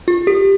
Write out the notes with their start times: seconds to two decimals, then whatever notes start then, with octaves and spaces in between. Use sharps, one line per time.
0.08 F4
0.27 G4